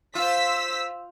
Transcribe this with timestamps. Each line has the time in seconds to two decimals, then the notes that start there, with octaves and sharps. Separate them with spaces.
0.15 F4 C5 E6 B6